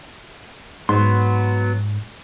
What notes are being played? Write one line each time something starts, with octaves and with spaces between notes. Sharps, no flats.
G#2 F#3 B3 C6